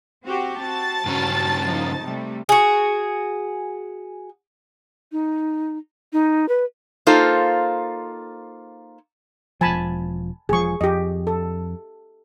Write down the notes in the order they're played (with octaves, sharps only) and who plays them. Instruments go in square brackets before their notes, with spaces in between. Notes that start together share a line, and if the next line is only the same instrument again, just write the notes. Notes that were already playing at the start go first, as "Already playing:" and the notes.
[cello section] C4 F#4 G4
[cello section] C4 F#4 [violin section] A5 A6
[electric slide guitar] G2 C#3 C#4 [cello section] F#3 F#4
[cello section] F3 D#4
C3 G3 A3
[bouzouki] F#4 G#4
[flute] D#4
D#4
B4
[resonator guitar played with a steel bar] A#3 D#4 F4 A4 C5
[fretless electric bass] E1 F3 [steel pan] G#5 A5 B5
[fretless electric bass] E1 F3 [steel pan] G#4 C#6
[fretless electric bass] F2 [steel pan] G4 D#5
[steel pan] A4